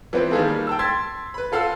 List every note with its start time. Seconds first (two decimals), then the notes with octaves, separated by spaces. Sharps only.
0.13 E3 F3 B3 C4 B4
0.31 D#3 G3 A#3 G#4 A4 B4
0.67 G5 A5 E6
0.79 C6 E6 G#6 A6 B6
1.34 B4 B5
1.52 F4 A4 F5 F#5 E6